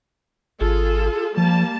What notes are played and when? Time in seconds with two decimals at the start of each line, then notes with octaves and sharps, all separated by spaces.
0.61 G#1 F4 G#4 A4
1.37 F3 G3 A#3 A5